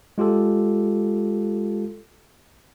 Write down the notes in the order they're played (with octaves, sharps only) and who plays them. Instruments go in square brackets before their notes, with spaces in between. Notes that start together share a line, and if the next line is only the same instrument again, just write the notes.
[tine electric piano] G#3 F4 G4 A4